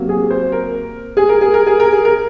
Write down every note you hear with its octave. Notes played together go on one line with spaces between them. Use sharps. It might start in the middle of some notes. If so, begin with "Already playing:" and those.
Already playing: C3 F#3 A#3
G#4
C5
A#4
G#4
A#4
G#4
A#4
G#4
A#4
G#4
A#4